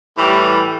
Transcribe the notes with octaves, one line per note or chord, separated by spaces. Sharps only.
A2 E3 G3 G4